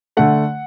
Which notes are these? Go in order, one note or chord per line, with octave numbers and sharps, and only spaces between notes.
D3 A3 F#5